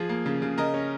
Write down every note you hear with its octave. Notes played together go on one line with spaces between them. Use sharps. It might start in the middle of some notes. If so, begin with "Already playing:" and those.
Already playing: F3 G#4
A#3
C#3
C#3
C#3 A#4 D#5
C#4